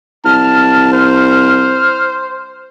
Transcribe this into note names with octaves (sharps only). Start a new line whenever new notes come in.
C2 A5 F6
C5